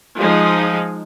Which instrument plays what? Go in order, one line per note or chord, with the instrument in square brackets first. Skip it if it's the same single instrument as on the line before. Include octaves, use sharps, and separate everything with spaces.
[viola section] F3 G#3 D#4